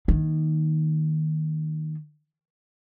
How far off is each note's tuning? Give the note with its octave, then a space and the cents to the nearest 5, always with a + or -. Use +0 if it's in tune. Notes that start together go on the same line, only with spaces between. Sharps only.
D#3 +0 A#3 +0